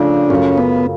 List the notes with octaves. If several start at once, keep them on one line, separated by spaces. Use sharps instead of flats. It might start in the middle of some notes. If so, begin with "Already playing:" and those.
Already playing: C#3 F3 A3 D4 F4
F#2 C#3 F#3 A3 C#4 F4
B3